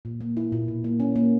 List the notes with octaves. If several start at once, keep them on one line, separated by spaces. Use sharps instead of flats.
A#2
A#3
E4
A#2
B2
A#3
C#4
A#3